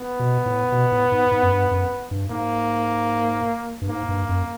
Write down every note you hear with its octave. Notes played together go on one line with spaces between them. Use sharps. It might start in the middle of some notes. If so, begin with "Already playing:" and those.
Already playing: B3
B2
A2
B2
A2
G#2
G#2
F#2
G2
F#2
G2
G#2 A#3
G2
G#2 A#3
G2
F#2